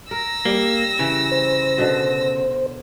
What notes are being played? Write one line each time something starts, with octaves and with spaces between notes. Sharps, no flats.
A#4 E6 A#6
G3 A#3
C#3 E3
C5
B2 D3